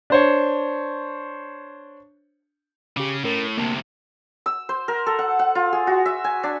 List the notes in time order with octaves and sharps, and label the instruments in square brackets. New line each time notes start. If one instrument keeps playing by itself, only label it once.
[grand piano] D4 C5 C#5
[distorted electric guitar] C#3 [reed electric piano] G4 D6
[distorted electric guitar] A2 [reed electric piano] C#4 A#4
[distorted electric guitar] D2 C3 [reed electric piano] A#3 A5
[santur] E6
C5
A#4
A4
F#5
F#5
F4
G#4
F#4
E5
G#5
D4